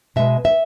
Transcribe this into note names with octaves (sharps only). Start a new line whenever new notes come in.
B2 G#3 E5
E5